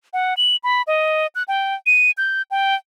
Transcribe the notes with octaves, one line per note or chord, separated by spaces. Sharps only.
F#5
F#7
B5
D#5
F#6
G5
D#7
G6
G5